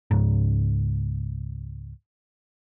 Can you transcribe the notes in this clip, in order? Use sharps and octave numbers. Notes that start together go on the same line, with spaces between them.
C#2 G#2